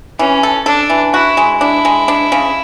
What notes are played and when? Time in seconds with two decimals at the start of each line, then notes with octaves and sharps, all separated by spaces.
0.19 E3 C#4
0.43 A4
0.66 D4 A4
0.90 E3
1.13 E4 F#4
1.37 G#3
1.61 D4 E4
1.85 G#3
2.08 D4
2.32 C#3